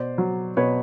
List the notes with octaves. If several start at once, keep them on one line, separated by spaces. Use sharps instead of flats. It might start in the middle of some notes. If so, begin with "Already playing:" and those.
Already playing: B2 C5 D5
F#3
B2 B4 C#5